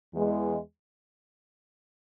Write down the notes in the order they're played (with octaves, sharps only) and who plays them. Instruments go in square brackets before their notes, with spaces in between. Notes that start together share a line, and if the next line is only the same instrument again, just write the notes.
[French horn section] E2 E3 G#3